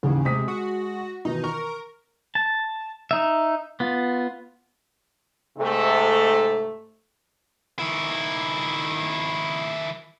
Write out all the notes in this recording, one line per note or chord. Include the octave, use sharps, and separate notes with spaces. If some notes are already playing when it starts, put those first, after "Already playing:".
A1 D#2 C#3
C3 G#3 D#6 B6
F#4
B2 D#3 E3 D#4
A#4 C#6
A5
D#4 E5
B3 F4
G#2 C3 A3
D#3 E4